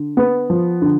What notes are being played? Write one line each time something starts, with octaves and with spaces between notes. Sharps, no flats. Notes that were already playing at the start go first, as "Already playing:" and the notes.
Already playing: D3
B3
F3
D3